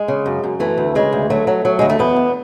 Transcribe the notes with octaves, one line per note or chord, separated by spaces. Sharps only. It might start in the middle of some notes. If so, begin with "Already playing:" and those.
Already playing: G#3
C#3
F#2
F#2
E3 A3
D2
C#3 G#3
D2
F#3 A3
F#3
F#3
D2 G#3
A3
E2 B3
E2